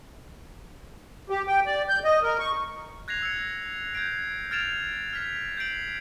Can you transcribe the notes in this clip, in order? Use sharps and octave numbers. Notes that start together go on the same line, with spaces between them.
G4
G5
D5
G6
D#5
A#4
C#6
F#6 G#6 A#6 C7 F7
E6 C#7
G6 G#6 C7 D7
F6 G#6 A6 D7 E7 F7
F6 B6 F7
G6 G#6 C7 D7 F#7